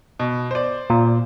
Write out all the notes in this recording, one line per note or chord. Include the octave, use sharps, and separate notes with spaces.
B2
C5 D5
A#2